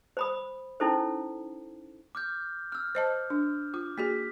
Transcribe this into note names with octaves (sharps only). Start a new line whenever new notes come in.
C5 B5 D#6
C#4 D#4 E4 A4 C5
D6 F6 G6
E6 F6
C5 D#5 A5
D4
F4 D6
A#3 F#4 G#4 B6